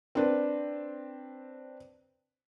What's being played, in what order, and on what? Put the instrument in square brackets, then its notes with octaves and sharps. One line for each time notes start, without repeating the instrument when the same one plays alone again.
[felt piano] C4 D4 B4